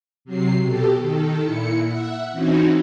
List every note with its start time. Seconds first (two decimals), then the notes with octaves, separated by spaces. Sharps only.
0.25 C3 F#3 C7
0.63 B2 G4 A4
0.99 D#3 A4
1.42 A#2 E4 C#7
1.84 E5 F#5
2.32 E3 C4 C#4 D#4 F#4